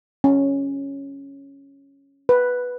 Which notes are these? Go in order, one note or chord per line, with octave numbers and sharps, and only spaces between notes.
C#4
B4